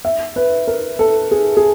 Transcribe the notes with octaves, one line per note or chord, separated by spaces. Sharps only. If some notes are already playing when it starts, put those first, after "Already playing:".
E5
B4
A#4
A4
G#4
G#4